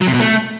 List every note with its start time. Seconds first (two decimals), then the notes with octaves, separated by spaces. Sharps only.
0.02 F#3
0.08 C3
0.14 B2
0.20 A3